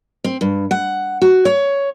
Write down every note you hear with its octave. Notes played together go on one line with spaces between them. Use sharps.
C4
G2
F#5
F#4
C#5